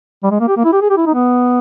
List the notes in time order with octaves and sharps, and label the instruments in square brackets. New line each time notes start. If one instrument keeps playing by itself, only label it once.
[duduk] G3
G#3
A#3
G4
A#3
E4
G4
G#4
G4
E4
D#4
B3